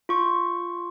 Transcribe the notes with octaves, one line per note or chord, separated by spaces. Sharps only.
F4 C#6